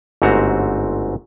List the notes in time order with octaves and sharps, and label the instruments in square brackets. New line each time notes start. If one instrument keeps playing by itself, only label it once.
[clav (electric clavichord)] G1 G#2 A3 C4 F#4 A#5